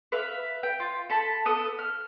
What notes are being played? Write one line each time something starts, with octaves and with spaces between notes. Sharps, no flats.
B4 E5 F5
G5
F4
A4 A5 B5
B3 A4 D#6
F6